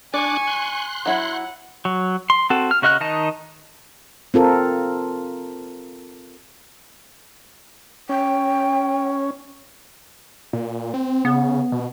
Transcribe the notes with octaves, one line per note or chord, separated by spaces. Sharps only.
D4 D5 G#5 C#6 D6 F#6
C6 F#6
F#3 E4 F#5
F#3
C6
C4 F#4 A4
F6
C#3 F#4 D#5 F6 F#6
D#3 D#4 D#5 A5
C4 F4 A4 A#4
C#4 G5
A#2
C4
C#3 B3
B2